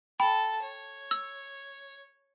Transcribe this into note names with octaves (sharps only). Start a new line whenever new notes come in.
A4 G5 A5 B5
C#5
E6